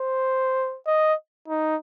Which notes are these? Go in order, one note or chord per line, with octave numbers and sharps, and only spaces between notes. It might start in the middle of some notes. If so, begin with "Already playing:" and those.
Already playing: C5
D#5
D#4